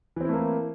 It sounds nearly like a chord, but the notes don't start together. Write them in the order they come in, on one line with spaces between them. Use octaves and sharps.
E3 C4 E4 A3 A#3